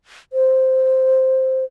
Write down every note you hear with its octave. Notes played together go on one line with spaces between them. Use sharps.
C5